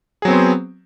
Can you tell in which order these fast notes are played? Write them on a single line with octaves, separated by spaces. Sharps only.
G#4 F#3 C4 B3 C5